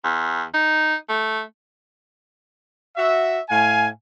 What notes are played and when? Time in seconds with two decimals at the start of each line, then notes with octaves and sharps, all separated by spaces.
0.04 E2
0.54 D#4
1.09 A3
2.96 F#4 E5
3.49 A2 F5 G#5